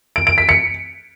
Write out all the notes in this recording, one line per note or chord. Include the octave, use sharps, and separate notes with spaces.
D7
D7
B6
C#7